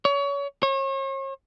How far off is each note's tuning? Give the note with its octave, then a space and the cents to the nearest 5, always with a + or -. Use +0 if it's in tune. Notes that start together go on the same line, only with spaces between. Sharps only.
C#5 +30
C#5 -40